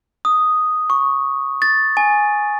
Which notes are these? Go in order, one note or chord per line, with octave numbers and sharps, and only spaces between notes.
D#6
C#6
A6
G#5